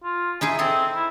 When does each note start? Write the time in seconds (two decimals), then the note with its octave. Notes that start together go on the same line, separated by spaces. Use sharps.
0.04 F4
0.41 D#4 E4 G#4 G#5
0.59 C4 G#4 A4
0.95 E4